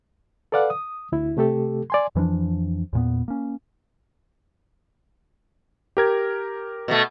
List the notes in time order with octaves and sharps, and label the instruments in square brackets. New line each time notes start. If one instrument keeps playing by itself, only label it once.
[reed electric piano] A4 B4 D5 F5 F#5
D#6
D2 E4
C3 A3 G4 A4
D5 G#5 C6
[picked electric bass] F2 E3 F3 D4
E2 A#2 B3
A#3 C#4
[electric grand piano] G4 A#4 G#6
[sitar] B2 A3